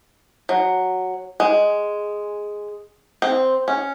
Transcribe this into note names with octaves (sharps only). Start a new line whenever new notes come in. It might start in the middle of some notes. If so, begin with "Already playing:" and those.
F#3
G#3
C4
C#4